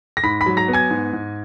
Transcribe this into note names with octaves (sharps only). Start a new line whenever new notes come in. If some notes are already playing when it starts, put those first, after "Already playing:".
A#6
G#2 B5 B6
B5 B6
F#3
A#5 A#6
B3
G#5 G#6
G#2
G#2